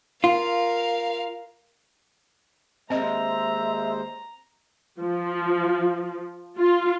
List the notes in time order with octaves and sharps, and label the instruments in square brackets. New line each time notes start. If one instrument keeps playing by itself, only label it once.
[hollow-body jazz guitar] F4 [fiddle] A#4 F5
[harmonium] D#2 G#3 C5 [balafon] C4 D#5 [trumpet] E5 [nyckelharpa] A#5
[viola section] F3
F4